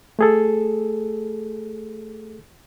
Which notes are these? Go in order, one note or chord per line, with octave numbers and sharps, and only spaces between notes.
A3 G#4 A4